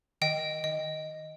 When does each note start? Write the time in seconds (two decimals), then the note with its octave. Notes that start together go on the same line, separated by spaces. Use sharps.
0.21 D#3 D#5 G5
0.64 D#3 D#5